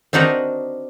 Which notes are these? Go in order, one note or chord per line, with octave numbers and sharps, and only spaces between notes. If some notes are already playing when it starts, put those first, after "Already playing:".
C4 D4 D#4 F#4 A#4 B4